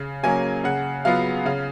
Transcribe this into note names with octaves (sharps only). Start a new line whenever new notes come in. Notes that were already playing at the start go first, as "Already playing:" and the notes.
Already playing: C#3
F#3 A#3 C#4 G#5
C#3 F#5
F#3 B3 F4 F5
C#3 F5